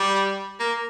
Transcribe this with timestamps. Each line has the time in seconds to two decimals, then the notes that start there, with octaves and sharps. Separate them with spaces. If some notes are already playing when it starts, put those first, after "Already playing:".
Already playing: G3
0.59 A#3